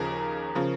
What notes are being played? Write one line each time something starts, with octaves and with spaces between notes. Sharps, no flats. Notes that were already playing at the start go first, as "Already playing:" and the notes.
Already playing: D#2 C#3 F3 G#4 A#4
C#3 F3